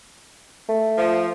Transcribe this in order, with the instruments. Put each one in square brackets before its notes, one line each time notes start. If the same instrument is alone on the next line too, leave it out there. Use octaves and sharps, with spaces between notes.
[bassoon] A3
[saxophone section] F3